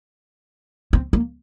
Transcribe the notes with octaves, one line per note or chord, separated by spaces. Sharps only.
C4
A#3